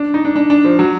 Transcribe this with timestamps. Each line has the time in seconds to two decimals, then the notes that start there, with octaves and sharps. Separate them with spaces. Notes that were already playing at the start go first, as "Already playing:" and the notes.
Already playing: D4
0.14 D#4
0.25 D4
0.36 D4
0.50 D4
0.65 F3
0.79 F#3